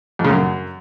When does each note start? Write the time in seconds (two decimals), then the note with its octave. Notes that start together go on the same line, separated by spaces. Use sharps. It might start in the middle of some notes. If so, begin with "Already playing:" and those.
0.19 F2
0.24 C#3
0.29 F#2